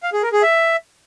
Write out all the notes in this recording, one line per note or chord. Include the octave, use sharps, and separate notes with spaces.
F5
G#4
A#4
G#4
E5